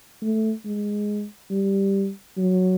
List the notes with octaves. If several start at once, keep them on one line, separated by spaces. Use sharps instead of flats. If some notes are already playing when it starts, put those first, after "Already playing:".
A3
G#3
G3
F#3